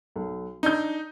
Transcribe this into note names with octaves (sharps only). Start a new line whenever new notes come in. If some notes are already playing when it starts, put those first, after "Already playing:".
B1
D4 D#4 G6